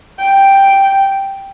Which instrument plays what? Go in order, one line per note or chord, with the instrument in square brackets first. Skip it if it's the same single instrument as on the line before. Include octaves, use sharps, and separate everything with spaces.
[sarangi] G5